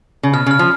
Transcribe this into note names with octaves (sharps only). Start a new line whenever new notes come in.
C#3
B2 F6
C#3
F6
F3